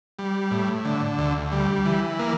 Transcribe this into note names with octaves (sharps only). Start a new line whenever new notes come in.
G3
A2
D3
D2
G3
E3
A#3